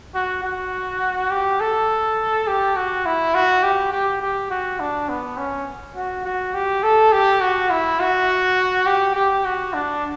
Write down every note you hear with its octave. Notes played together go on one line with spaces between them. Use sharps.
F#4
F#4
G4
A4
G4
F#4
E4
F#4
G4
G4
G4
F#4
D4
B3
C#4
F#4
F#4
G4
A4
G4
F#4
E4
F#4
G4
G4
F#4
D4